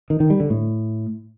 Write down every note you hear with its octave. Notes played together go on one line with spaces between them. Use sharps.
D#3
D#3
G3
D3
A2